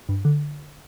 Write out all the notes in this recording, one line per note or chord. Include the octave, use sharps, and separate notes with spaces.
G2
D3